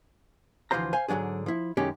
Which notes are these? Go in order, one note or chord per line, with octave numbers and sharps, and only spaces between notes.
D2 E3 F3 F4 C5 A#5
C5 F5 G#5
G#2 D3 F#3 D4 G#4
F3 E4
F#2 D#3 G#3 C#4 G4